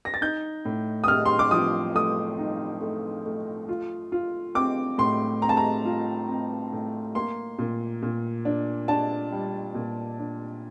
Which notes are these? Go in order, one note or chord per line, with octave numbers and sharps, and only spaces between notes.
A#6
A6
D#4 G6
A2
D#6
A2 F6
C6
D6
F3 D#6
A3 D#6
D#4
A3
A3
F4
F4
C4 D6
A2 C6
C4 A#5
A5
A#5
F4
C4
A2
A#3 C6
A#2
A#2
D4
D4 A5
G3
A#2
D4